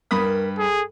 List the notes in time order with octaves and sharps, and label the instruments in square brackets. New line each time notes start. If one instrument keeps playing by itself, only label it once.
[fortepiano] G2 B5 D#6 [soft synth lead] A#4
[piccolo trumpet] G#4 [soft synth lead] A4